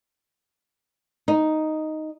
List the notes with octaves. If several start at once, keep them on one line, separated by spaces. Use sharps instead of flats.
D#4